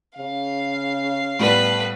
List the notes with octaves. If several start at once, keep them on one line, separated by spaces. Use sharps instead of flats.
C#3 F5
A2 G3 B3 B4